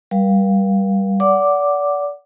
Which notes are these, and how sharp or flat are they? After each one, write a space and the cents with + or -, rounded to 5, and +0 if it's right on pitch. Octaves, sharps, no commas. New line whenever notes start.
G3 +0 A#4 +45 F5 +0
D5 -30 F#5 +0 D6 +0